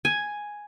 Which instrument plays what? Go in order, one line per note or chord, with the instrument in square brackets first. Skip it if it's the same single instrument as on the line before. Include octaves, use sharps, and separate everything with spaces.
[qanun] G#5